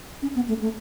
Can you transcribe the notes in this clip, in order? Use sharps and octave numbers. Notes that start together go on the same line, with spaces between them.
C#4
B3
A3
A3